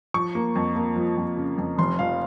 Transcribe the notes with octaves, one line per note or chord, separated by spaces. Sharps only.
F3 C#6
A#3
F2
A#3
F3
F2
C#3
F2
F1 C6
F2 F5